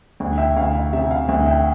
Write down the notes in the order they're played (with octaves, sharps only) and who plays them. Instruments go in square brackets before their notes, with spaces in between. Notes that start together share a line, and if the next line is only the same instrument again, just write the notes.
[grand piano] D2
E5 G5
D2 F5
F5
C3 E5
F5
D2 E5
E5 G5